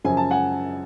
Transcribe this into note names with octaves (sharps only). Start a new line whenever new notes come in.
F#2 C#3 F3 G#5
A5
F#5 G#5